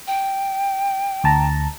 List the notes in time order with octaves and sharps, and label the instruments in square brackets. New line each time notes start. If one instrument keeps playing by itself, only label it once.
[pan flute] G5
[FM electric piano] D2 A5 A#5